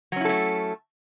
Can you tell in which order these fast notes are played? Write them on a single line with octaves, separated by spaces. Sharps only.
F#3 C#4 E4 A4 A3